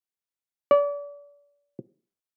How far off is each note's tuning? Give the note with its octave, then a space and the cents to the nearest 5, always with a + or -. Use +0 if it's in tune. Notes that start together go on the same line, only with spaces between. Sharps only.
D5 -35